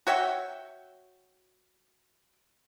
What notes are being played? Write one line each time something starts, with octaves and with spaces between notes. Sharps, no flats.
F#4 C#5 E5 G5